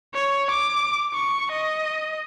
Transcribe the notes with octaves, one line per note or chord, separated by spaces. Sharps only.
C#5
D6
C#6
D#5